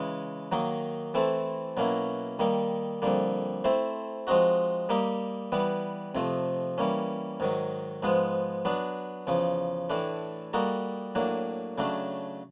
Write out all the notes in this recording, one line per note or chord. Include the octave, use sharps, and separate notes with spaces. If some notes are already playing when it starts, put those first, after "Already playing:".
Already playing: C#3 E3 G#3
D#3 F#3 A#3 D#4
E3 A3 C4 E4 A4
B2 F#3 A#3 C#4 E4
D#3 G3 A#3 D#4
F2 D3 G3 A#3
A3 C4 E4 A4 C5
F3 G#3 C4 D#4 F#4
G3 A#3 D#4 G4
E3 G3 B3
F2 C3 F3 A3
E3 G3 A#3 C#4
G#2 D#3 F#3
G#2 F3 G#3 B3
F#3 B3 D4
E2 C#3 F3
A2 E3 A3 D4
G3 A#3 D#4 F#4 A4
A2 F#3 A#3 D4
C#3 F#3 A3 D4